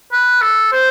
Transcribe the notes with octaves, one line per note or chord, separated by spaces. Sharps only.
B4
A4
C5